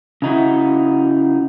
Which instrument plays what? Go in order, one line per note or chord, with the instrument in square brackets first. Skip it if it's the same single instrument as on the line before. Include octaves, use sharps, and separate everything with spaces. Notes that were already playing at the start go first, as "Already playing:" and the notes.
[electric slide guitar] C#3 D#4 E4 F#4